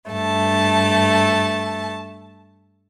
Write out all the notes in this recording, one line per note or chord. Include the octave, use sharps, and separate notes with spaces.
G2 A3 A5